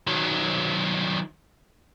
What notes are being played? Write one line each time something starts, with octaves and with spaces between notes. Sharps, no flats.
D#3 F#3